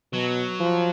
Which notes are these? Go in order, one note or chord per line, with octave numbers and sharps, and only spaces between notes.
B2 F#3
F3